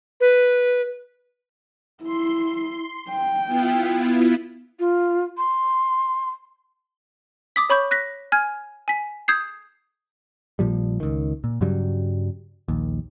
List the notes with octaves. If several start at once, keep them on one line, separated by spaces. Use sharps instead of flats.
B4
E4 C6
G5
B3 E4 F4
F4
C6
D6 D#6 B6
C#5 B5 C#6 G6
F#6 A#6 B6
G#5 F6 G#6
G#5 B6
D#6 G6 G#6 C7
A#1 A#2 F3 G3
C#2 D#3
A#2
G2 C#3 F#3 G3
A#1 D#2